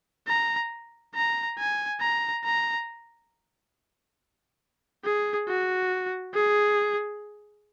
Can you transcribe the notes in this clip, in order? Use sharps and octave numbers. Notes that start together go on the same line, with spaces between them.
A#5
A#5
G#5
A#5
A#5
G#4
F#4
G#4